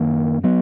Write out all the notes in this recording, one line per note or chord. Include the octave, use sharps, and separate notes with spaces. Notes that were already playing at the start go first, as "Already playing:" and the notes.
Already playing: F#2 D#3 A#3
F#3 B3